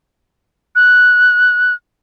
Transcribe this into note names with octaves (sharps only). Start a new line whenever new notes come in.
F#6